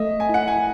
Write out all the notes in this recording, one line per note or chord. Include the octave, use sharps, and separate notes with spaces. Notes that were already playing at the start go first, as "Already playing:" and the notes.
Already playing: A3 D#5 E5
G#5
E4 F#5
G#5